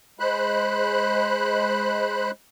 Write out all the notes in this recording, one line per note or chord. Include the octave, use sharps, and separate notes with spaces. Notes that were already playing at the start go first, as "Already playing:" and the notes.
G#3 C5 B5 F#6